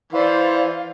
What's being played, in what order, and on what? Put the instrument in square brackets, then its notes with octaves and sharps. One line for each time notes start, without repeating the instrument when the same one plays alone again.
[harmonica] E3 [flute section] C5 D5 C6 [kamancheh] F5